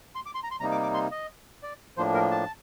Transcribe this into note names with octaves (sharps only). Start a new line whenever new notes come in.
C6
D6
C6
A#5
C6
C3 G3 A#3 D#4 A#5
D6
D6
C6
D#5
D5
A2 F3 A#3 D4 C5
A#4
A5